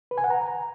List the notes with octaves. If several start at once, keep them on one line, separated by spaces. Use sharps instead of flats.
B4
G#5
F#5
A#5